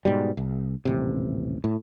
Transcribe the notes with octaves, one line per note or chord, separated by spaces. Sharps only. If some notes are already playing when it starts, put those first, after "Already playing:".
G#2 B2 G3
C2
D#1 A1 C3
A2